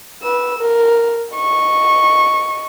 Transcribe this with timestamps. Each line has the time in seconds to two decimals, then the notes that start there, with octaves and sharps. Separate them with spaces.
0.22 B4 E6
0.58 A#4
1.34 D#5 C#6